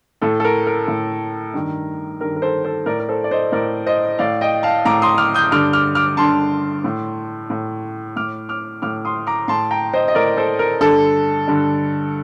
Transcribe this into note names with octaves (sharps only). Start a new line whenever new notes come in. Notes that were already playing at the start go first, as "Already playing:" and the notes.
A2 A4
A4
A#4
A#4
A2
G2 D#3
G2 D#3 A#4
A#4
A4 C5
A4 C5
A2 A#4 D5
A#4
A4 C5
D5
C5 D#5
A2 A#4 D5
C5 D#5
A2 D5 F5
D#5 G5
F5 A5
A2 A#5 D6
C6 D#6
D6 F6
D#6 G6
G2 D3 D6 F6
D6 F6
D6 F6
G2 D3 A5 C6
A2
A2
A2 D6 F6
D6 F6
A2 D6 F6
C6 D#6
A#5 D6
A2 A5 C6
G5 A#5
C5 D#5
D#5
A2 A#4 D5
A4 C5
A#4
G2 D3 A4
G2 D3